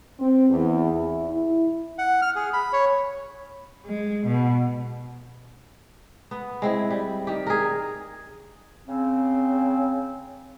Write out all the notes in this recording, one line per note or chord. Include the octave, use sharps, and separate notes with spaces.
C4
E2
E4
E4
F#5
F6
G#4
B5
C#5
G#3
B2
B3
G#3 C4 E4
G3
D#3 G4
G#4 A#4
C#3 C4